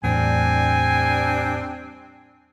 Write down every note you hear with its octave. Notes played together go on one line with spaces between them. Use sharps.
E2 A2 G3 C4 D4 G#5